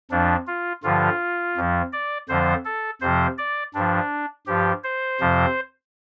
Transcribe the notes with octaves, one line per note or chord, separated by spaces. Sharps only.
F2 F3 D4
F4
G2 D3 F3 F4
F2 F3
D5
F2 D3 F3 C5
A4
F2 C3 F3 C5
D5
G2 F3 D4
G2 F3 G4
C5
F2 C3 F3